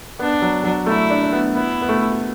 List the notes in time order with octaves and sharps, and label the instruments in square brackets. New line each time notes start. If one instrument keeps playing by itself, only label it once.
[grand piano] B3 [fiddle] D4
[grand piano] F#3
F#3
[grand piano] A3 [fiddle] E4
[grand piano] D4
D4
B3
[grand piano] B3 [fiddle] E4
[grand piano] B3
A3